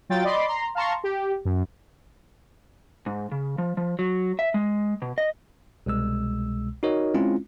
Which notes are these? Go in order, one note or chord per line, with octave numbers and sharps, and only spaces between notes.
F#3 F4 G5 A6
D5 D#5 B5 C6 D6
A#5 C6
F5 A5 A#5 C6 C#6
G4
F#2
G#2
C#3
F3
F3
F#3
E5
G#3
B2
D#5
C2 B2 G#3 E6
D#4 F#4 A#4 C#5 D#5
G#3 C4 C#4 E4 F4